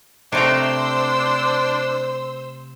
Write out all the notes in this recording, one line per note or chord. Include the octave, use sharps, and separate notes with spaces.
C3 A3 D4 C5 A#5 E6